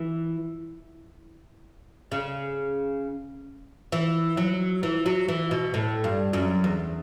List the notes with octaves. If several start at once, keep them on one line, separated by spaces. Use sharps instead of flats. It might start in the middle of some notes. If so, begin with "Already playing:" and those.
Already playing: E3
C#3
E3
F#3
E3
F#3
E3
B2
A2
G2
F#2
E2